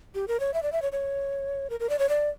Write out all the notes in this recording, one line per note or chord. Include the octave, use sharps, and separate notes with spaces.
G4
A#4
C#5
E5
D5
E5
C#5
C#5
A#4
A#4
D5
C#5
D5